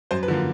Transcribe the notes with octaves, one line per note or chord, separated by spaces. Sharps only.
F#2 C5
B4
D3 F3 A#3